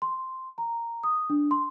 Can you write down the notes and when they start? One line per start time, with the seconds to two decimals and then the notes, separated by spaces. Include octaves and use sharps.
0.02 C6
0.58 A#5
1.03 D#6
1.30 D4
1.51 C6